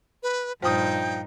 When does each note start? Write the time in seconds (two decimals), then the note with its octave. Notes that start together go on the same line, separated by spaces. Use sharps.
0.23 B4
0.62 G2 A#2 F3 D#4 G5 D#6